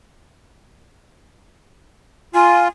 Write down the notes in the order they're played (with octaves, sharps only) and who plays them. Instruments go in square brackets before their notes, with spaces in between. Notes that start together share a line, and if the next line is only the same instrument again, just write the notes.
[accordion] F4 [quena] G#5